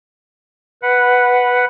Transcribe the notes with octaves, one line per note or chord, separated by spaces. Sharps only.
B4 F#5